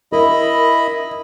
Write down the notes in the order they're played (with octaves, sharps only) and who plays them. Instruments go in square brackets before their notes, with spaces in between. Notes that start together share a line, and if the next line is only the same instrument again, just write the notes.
[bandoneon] E4 D#5 B5 [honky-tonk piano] A#4